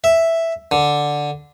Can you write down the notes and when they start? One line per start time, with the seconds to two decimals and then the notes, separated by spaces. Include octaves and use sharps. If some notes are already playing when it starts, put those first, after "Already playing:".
0.04 E5
0.71 D3